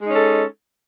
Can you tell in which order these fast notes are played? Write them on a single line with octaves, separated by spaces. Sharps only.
G#3 D#4 C#4 A4